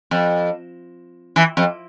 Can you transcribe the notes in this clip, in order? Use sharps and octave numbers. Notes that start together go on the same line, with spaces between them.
F2
E3
F2